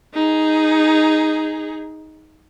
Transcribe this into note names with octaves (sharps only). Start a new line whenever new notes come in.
D#4 G#4